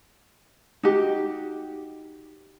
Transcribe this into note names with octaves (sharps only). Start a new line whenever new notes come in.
D#4 F#4 G4